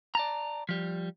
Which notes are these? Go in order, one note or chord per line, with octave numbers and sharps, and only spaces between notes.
D5 A5 A#5
F3 G3